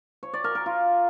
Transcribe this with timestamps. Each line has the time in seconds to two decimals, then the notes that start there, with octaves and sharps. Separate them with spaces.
0.23 C#5
0.33 D5
0.44 A#4
0.55 A#4
0.66 F4